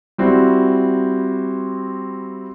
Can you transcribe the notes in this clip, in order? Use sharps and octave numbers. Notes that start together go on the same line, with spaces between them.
G3 C4 E4 F#4